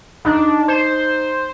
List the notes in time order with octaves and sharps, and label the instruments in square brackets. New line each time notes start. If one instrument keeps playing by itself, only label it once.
[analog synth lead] D4 [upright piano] D#4
[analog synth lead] C5